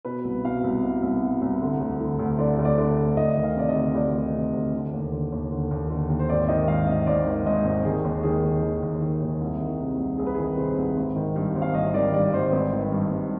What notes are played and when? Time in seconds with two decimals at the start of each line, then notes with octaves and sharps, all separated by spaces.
0.05 B2 B4
0.24 C2
0.45 B2 F5
0.64 C2
0.83 B2
1.03 C2
1.22 B2
1.42 C2
1.61 D3
1.80 D2
2.01 D3
2.19 D2
2.39 D3 D5
2.59 D2
2.65 D5
2.78 D3
2.98 D2
3.17 D2 D#5
3.37 D#3
3.44 F5
3.56 C3 D5
3.69 D#5
3.76 D2
3.95 D2 D5
4.14 D#3
4.34 C3
4.54 D2
4.73 D3
4.93 D#2
5.12 D3
5.32 D#2
5.51 D3
5.71 D#2
5.90 D3
6.09 D#2
6.19 C5
6.29 G#1 D5
6.48 D#3 D#5
6.68 G#2 F5
6.87 G#1 D#5
7.07 G#1 D5
7.26 D#3
7.46 G#2 D#5
7.65 G#1
7.85 D#3 G#4
8.04 D#2
8.23 D#3 G#4
8.43 D#2
8.62 D#3
8.82 D#2
9.02 D#3
9.22 D#2
9.41 C2
9.60 D#3
9.80 C3
9.99 C2
10.18 C2 G#4
10.27 B4
10.34 D#3 G#4
10.57 C3 C5
10.78 C2
10.97 G#1
11.16 D#3
11.36 G2
11.55 G#1
11.62 F5
11.74 G#1 D#5
11.94 D#3 D5
12.14 G2 D5
12.33 G#1 C5
12.52 G#1 B4
12.72 D#3
12.92 G2
13.11 G#1